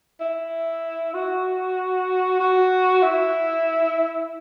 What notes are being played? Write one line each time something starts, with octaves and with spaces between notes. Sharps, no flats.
E4
F#4
F#4
E4